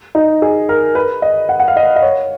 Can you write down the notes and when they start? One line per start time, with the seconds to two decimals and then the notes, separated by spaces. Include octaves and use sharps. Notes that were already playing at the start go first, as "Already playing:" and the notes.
0.15 D#4
0.42 G#4
0.69 A#4
0.95 B4
1.22 D#5
1.49 F#5
1.60 F#5
1.68 F5
1.77 D#5
1.96 D#5
2.02 C#5